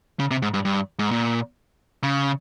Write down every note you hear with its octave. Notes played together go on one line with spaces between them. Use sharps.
C#3
C3
G#2
G2
G2
G#2
A#2
C#3